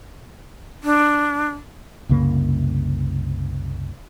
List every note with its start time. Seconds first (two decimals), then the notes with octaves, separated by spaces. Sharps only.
0.84 D4
2.09 C2 F#2 C#3 A#3